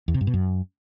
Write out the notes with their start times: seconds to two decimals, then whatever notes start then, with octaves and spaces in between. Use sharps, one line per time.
0.08 E2
0.14 C3
0.21 G2
0.27 B2
0.34 F#2